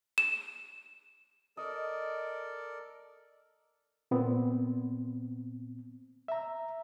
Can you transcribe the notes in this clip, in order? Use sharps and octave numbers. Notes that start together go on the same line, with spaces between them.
E7
A4 A#4 D5 D#5
A#2 B3 C4
E5 A#5